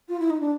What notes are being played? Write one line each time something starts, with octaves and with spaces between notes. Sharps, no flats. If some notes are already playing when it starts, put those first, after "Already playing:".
F4
E4
D#4
D4